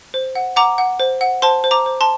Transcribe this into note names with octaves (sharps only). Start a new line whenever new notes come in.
C5
F#5
F#5 A#5 D6
F#5
C5
F#5
C5 A5 C6
C5
A#5 D6
C5
A5 C6